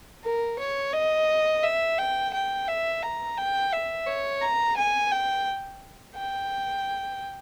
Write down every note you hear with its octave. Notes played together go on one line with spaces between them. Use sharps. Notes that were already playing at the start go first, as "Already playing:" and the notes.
A#4
C#5
D#5
E5
G5
G5
E5
A#5
G5
E5
C#5
A#5
G#5
G5
G5